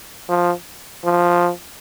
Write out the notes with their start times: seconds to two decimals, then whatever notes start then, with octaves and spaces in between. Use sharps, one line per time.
0.29 F3
1.05 F3